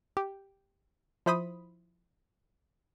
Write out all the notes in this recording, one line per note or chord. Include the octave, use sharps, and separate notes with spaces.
G4
F3 E4 C5 B5 D#6